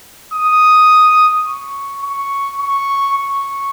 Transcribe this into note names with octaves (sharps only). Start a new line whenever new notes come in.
D#6
C#6
C#6
C#6
C#6